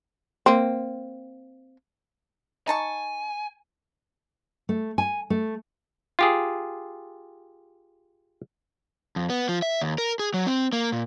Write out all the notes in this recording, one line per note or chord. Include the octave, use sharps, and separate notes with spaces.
A#3 C4
D#4 G#5 A5 C#6
A3
G#5
A3
F4 G4 G#4
F2
B3
F3
E5
D#2
A#4
G#4
F#3
C4
A#3
A#2